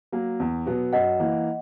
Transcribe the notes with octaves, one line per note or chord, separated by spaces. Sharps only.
F#3 A#3
E2
B2 F#3 B3
F#2 D#5 F#5
E3 A#3